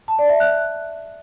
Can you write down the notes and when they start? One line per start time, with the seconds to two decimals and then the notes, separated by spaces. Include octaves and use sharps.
0.08 A5
0.19 D5
0.29 E5
0.40 F#6